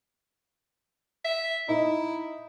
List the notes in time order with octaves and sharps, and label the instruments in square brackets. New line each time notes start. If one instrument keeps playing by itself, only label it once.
[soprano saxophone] E5
[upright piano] D#4 [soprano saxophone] E4